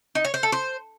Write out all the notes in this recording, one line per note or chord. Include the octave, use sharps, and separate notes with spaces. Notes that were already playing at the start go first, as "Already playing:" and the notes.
D#4
C#5
C5
A4
C5